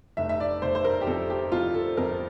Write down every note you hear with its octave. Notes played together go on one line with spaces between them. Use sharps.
F1 E5
E5
D5
F1 C5
C5
A#4
G4
F2 A4
G4
F2 F4
A4
F2 A#4